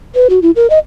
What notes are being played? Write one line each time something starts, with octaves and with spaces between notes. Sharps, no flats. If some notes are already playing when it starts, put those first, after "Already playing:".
B4
F#4
E4
A#4
D#5